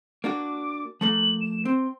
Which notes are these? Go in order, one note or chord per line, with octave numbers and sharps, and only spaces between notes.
A#3 D4 F#4 D6
F3 A3 A#3 F#7
E7
C4 C6